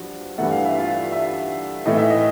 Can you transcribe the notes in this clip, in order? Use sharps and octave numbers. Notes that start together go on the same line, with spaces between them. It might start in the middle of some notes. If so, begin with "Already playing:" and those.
Already playing: G2 F3 F4 F#4
G2 E3 A3 F#5
F5
E5
F4 F5
E5
A2 E3 A3 D#5
E5
D#5